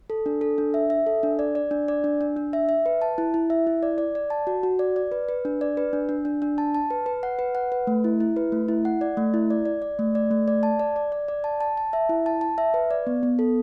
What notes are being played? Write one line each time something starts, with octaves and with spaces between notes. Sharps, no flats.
A4
D4
A4
D4
E5
E5
A4
D4
D5
D5
D4
D5
D4
D4
D4
E5
E5
B4
A5
E4
E4
E5
E4
D5
D5
D5
A5
F#4
F#4
D5
D5
B4
B4
D4
D5
B4
D4
D4
D4
D4
A5
A5
B4
B4
F#5
B4
F#5
B4
A3
E4
E4
B4
A3
E4
F#5
D5
A3
E4
D5
D5
D5
A3
D5
A3
D5
A5
D5
D5
D5
D5
A5
A5
A5
E5
E4
A5
A5
E5
B4
D5
B3
B3
A4